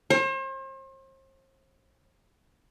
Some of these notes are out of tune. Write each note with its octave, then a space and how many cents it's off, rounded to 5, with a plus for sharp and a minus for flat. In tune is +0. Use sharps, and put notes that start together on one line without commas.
C5 +40